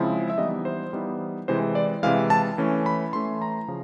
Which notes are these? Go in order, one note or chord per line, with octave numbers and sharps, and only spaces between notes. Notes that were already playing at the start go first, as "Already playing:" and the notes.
Already playing: C#3 F3 G#3 C4 E4
E5
E3 G3 B3 D#4 D#5
C5
E3 G3 B3 D#4
C3 E3 G#3 C5
D5
C3 E3 G#3 F5
A5
E3 A3 C#4
B5
E3 A3 C#4 C6
A#5
C#3 F3